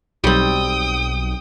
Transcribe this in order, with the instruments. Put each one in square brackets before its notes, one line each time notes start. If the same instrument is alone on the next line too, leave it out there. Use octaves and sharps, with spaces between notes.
[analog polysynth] B1 [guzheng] G3 C4 [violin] G5 D#6